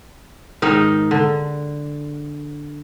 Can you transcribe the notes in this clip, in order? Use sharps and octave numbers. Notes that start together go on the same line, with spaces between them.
G#2 D#3 D#4
D3